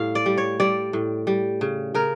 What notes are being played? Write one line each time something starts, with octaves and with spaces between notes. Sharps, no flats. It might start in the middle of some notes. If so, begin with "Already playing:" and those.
Already playing: A2 G3 F5
D5
G3
C#5
G3 D5
A2
G3
C#3
C#3 A#4